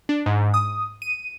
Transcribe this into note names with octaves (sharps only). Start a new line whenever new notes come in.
D4
G#2
D#6
D#7